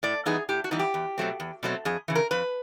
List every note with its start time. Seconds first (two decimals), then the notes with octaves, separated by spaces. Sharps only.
0.03 A2 D5
0.26 E3 G3 B3 D#4 G#4
0.49 A2 G4
0.64 F#4
0.71 E3 G3 B3 D#4
0.79 G4
0.94 E2
1.18 B2 F#3 A3 C4
1.40 E2
1.63 B2 F#3 A3 C4
1.85 F2 G#4
2.08 C#3 E3
2.15 A#4
2.31 F2 B4